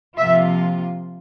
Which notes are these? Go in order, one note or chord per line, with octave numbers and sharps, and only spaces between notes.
C3 F3 A#3 F4 E5